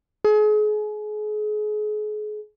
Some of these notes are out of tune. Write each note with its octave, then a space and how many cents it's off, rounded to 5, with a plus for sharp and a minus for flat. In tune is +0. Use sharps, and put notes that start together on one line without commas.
G#4 +35